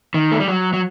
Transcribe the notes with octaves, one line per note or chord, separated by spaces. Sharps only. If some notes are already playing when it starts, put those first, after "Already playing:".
D#3
A3
G3
F#3
F#3